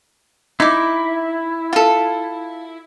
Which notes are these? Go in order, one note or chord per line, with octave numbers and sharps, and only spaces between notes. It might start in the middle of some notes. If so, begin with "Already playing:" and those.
D#4 E4 D6
F4 A4